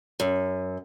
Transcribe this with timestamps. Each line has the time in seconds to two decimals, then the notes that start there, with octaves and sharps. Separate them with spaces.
0.20 F#2